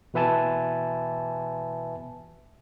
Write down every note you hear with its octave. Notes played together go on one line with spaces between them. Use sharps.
B2 E3 B4 E5 G#5 A5